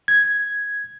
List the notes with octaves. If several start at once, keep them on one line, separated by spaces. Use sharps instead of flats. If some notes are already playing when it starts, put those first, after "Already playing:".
G#6